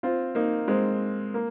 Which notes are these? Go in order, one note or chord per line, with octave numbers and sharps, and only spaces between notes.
C4 F4
A#3 D#4
G#3 C4
A#3